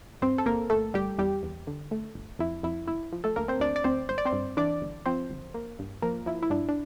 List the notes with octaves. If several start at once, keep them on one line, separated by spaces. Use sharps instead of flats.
G2 C4 C5
A4
G1 A#3 A#4
G1 A3 A4
G1 G3 G4
E2 G3 G4
E2
D3
A3
G1
F2 E4
F2 E4
G1 E4
F3
A3 A4
D2 A#3 A#4
C4 C5
D2 D4 D5
D5
D2 C4 C5
G1 C5
D5
C4 C5
G2
E3 D4 D5
G1
F3 C4 C5
G1
A#3
G2
F3 A#3 A#4
F3 E4
E4
G2 D4
D4